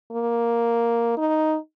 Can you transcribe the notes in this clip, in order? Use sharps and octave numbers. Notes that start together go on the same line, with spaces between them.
A#3
D#4